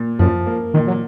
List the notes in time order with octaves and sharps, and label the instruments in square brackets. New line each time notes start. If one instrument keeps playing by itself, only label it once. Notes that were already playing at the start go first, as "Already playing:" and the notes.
Already playing: [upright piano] A#2
[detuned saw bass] F#2 [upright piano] F3
[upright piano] A#3
[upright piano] A#2 [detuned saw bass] D#3
[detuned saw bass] F#3